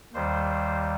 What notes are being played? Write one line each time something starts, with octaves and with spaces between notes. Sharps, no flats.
D#2 D#3 G3 C5
C5